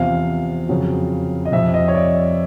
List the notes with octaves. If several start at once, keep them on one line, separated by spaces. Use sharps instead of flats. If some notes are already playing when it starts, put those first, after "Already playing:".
Already playing: E2 C3 F3 F5
F2 C#3 F#3
D#5
F2 C3 F3 E5
D#5
C#5
D5